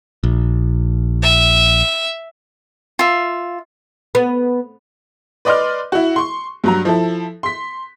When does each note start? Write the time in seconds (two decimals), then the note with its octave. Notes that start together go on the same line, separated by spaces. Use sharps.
0.24 A#1
1.23 E5
2.99 F4 E5
4.15 B3
5.45 B4 D5 D#5 C6 D6 F6
5.92 E4 F#4
6.16 C6 C#6
6.64 G2 F#3 A#5
6.85 F3 E4 A4
7.43 C6 B6